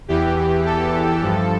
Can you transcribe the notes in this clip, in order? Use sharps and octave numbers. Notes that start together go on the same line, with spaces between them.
E2 E3 G4
A4
G2 F3